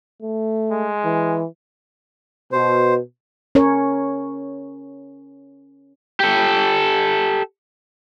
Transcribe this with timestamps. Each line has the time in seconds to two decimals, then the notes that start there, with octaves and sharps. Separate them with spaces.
0.23 A3
0.71 G#3
1.05 E3
2.52 B2 C5
3.55 C#4 A#4 C#5
6.20 G4 A4